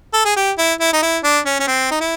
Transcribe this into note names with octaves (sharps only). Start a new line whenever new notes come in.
A4
G#4
G4
E4
E4
D#4
E4
D4
C#4
C#4
C4
D#4
E4